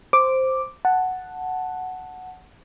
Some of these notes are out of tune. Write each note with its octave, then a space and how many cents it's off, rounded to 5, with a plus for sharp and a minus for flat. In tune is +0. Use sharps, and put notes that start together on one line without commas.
C5 +0 D6 +0
F#5 +0 A5 +0